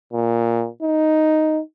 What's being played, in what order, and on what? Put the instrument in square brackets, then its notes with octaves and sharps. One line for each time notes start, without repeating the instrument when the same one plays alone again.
[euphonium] A#2
D#4